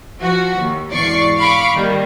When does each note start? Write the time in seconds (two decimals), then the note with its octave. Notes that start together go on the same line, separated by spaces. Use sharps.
0.20 F3 F#4
0.58 D#2
0.92 G#1 E2 D5 C#6 C7
1.39 F5 B5 C#6 D6
1.74 D#3 G3 A#3